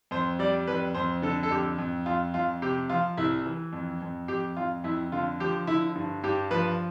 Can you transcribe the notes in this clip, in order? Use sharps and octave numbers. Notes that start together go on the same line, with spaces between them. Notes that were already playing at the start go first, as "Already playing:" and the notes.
F2 C5
G3 D5
F2 B4
F2 C5
D3 A4
A4
F2 G4
F2
F2 F4
F2 F4
C3 G4
F3 F4
C2 E4
E3
F2
F2
F2 G4
F2 F4
F2 E4
D3 F4
F3 G4
D3 E4
G2
G2 G4
F3 B4